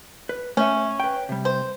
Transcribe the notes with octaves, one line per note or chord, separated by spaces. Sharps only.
B4
A3 C#4 E5
B4 G5
C3 G3
C5